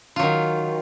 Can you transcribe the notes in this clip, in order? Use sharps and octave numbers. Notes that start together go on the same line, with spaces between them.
D#3 F#3 F4